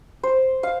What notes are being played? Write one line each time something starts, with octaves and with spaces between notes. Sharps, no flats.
C5
F5